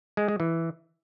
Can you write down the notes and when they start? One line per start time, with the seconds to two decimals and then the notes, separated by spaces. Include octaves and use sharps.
0.17 G#3
0.28 G#3
0.40 E3